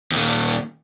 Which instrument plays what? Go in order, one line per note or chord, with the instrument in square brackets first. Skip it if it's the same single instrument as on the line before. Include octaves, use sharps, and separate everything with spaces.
[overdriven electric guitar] D#2 A#2